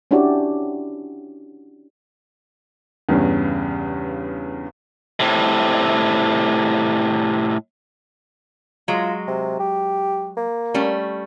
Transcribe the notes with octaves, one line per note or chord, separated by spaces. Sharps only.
C#4 D4 E4 F#4 G4 D5
E2 G2 C#3
A2 C3
F#3 G#3 F4
C3
G4
A#3
G3 A3 C#4